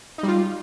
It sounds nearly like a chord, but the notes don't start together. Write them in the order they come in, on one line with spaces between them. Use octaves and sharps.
D#4 G3 F4